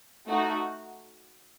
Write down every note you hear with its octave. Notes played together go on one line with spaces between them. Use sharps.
A3 D#4 F#4